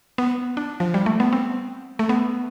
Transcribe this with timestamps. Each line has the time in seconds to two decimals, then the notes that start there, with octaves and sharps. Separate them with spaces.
0.18 B3
0.57 D4
0.80 F3
0.94 G3
1.06 A3
1.20 B3
1.33 C4
1.99 A3
2.09 B3